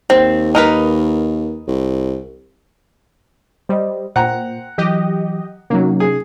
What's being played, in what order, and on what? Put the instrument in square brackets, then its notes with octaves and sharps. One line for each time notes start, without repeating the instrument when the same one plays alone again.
[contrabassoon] D#2 [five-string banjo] C4
[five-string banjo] D#4 A#4 B4
[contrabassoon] C2
[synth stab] G3 [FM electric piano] C5 D#5
[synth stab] A#2 [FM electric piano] C5 G5 [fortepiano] F#5 A#5
[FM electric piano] E3 F#3 [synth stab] G4 D#5
[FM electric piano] C3 C#4 D#4 [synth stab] F#3 A#3
[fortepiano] G#4